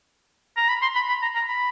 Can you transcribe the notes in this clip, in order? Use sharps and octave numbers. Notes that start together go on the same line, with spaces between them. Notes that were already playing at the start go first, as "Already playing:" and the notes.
A#5
B5
C6
B5
B5
A#5
A#5
B5